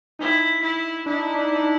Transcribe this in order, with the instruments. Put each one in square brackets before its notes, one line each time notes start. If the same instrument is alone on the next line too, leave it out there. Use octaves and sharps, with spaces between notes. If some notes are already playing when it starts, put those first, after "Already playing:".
[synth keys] D#4 [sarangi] E4
[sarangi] E4
[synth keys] D4 [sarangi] E4
[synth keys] D#4
D4
D#4
D4
D#4
D4
D#4
D4